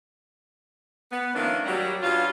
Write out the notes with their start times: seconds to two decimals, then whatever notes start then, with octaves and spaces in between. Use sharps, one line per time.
1.11 B3
1.34 D#3 F3 A3 A#3 C#4 D4
1.66 F#3 G3
2.02 G2 F#3 C#4 F4